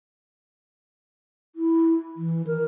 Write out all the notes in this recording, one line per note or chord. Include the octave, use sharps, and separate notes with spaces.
E4
E3
A#4